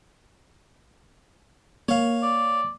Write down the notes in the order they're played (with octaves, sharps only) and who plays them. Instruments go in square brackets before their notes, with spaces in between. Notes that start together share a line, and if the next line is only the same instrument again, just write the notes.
[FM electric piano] A#3 [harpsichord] C#5 F5
[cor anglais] D5